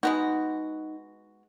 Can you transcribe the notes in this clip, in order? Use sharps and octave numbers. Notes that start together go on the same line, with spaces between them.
G#3 B3 D#4 F#4